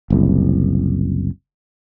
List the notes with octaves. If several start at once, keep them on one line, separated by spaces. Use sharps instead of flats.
F#1 C2